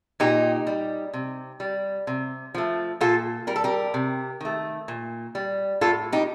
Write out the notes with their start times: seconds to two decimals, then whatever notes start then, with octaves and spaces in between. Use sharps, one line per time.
0.20 A#2 D#4 G4
0.67 G3
1.14 C3
1.60 G3
2.07 C3
2.55 F3 A3
3.01 A#2 F4 A4
3.47 G3 A#4
3.56 A4
3.64 G4 A#4
3.94 C3
4.41 D#3 A3
4.88 A#2
5.35 G3
5.81 A2 F4 A4
6.12 D#4 G4